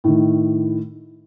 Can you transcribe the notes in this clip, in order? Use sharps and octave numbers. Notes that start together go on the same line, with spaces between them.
A2 D#3